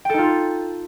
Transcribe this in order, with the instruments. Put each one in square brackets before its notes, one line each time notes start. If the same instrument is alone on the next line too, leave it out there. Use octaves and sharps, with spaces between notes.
[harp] G5
A4
D#4
F4